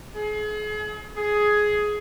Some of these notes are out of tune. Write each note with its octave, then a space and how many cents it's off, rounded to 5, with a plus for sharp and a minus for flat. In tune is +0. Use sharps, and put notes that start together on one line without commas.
G#4 +35
G#4 +10